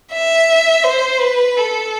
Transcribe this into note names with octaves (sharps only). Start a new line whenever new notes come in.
E5
C5
B4
A4